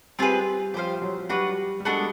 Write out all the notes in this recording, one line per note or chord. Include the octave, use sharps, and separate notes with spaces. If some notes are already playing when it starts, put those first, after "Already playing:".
G3 C4 F4 G#4 B4
F3 G4 C5 F5
F#3
G3 D4 F#4 B4
G3
G#3 B3 D4 F#4 A4